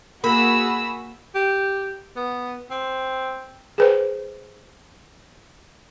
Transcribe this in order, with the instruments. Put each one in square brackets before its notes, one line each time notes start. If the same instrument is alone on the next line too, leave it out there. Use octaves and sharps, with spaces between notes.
[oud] A#3 [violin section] F#4 G#4 E6 [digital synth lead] B5
[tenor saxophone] G4
B3
C4
[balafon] G#4 B4 C5